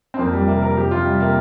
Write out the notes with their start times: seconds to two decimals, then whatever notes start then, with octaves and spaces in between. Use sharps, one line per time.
0.14 C4
0.18 F2 A#3
0.33 F2 G3
0.48 C3 A#3
0.62 C3 A#4
0.77 F2 G4
0.91 F2 F4
1.05 C3 G3
1.20 C3 A#3